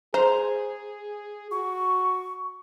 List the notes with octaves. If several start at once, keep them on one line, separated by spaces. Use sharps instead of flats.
G#4 C5 A#5
F#4 C#6